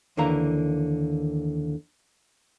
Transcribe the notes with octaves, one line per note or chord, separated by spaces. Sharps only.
D#2 D3 E3 A#3 F5 A#5